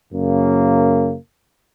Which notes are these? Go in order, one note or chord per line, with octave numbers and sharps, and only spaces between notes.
F#2 C#3 A#3